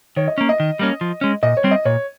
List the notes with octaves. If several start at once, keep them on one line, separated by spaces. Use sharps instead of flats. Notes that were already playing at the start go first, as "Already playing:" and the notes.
D#3 C#5
D#5
A#3 C#4
D#5
D#3
G3 A#3 C#4
F3
G#3 C#4
A#2 D#5
C#5
G3 C4
D#5
A#2 C#5